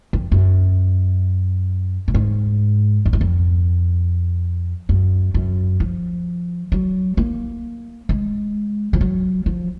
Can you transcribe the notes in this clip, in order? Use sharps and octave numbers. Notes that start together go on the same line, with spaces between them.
F2
F#2
A#2
G#2
F2
F#2
F2
F#2
F#2
F3
F#3
A#3
G#3
F3
F#3
F3